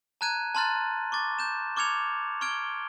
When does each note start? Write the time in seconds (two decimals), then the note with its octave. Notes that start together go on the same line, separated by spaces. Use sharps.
0.21 A5 A#5 F#6 G#6 D#7
0.55 A5 A#5 C6 F6 F#6 A6
1.12 C#6 D6 A6
1.39 G6 E7
1.76 C#6 D6 F6 G#6 C#7 F7
2.41 C#6 F6 G#6 D7 G7